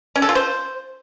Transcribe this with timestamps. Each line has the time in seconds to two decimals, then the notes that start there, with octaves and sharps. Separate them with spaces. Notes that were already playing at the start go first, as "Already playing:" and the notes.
0.16 C#4
0.22 A4
0.29 F4
0.35 C5